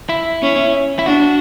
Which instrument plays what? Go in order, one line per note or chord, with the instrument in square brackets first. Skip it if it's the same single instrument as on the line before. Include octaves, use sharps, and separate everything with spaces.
[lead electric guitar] E4
[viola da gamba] C#4
[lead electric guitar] E4
[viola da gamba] D4 [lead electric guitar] F#4